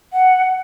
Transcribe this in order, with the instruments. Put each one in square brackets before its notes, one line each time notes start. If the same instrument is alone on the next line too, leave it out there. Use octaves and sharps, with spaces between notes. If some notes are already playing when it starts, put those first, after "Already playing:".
[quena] F#5